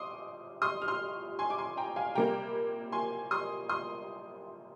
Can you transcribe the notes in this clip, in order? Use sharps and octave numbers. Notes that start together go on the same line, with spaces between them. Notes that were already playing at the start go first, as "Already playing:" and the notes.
Already playing: C6 D6 D#6
C6 D#6
F6
C6 D#6
G#5 C6
D6
G#5 C6
G5 A#5
F5 G#5
C3 G3 A#3 G5 A#5
G#5 C6
C6 D#6
C6 D#6